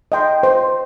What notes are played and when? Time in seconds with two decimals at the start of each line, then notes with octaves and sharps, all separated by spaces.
0.12 D#5 G5 C6
0.43 C5